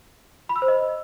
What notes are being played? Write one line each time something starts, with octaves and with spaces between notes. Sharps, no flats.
B5
E6
C5
D#5